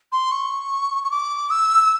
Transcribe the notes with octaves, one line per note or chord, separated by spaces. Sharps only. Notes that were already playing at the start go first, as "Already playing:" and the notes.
C6
C#6
C#6
D6
E6